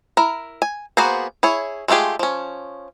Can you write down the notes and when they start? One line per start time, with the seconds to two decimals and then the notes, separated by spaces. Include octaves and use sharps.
0.17 E4 A#4
0.62 G#5
0.97 A#3 B3 F#4 G#4 C5
1.43 E4 G#4 C#5
1.88 G#3 A3 F4 G4 G#4
2.19 F3 C#4